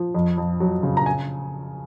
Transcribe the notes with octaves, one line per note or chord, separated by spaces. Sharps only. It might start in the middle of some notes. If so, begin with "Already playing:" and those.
Already playing: F3
F2
F2
F#3
C#3
A#5
G#5